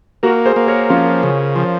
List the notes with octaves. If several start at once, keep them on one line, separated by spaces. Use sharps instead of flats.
A#3 F#4 A#4
G#4 C5
A#3
A#4 C#5
F3 C#4 F4
C#3
F3